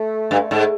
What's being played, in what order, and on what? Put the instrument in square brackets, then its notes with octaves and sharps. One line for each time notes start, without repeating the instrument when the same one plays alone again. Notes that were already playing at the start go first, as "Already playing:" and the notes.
Already playing: [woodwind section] A3
[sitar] G2
[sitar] G#2 [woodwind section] A3